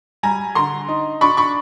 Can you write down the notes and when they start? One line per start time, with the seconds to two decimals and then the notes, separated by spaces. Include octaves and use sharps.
0.23 G3 G#5 A#5
0.55 D3 A#5 C6
0.88 D#4
1.21 D4 B5 C#6
1.37 B5 C#6